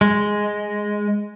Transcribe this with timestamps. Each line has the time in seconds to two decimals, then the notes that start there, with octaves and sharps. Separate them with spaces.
0.01 G#3